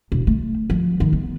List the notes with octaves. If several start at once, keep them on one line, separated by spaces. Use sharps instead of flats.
E1
A3
F3
D#3
B3